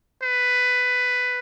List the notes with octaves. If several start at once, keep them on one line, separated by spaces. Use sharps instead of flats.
B4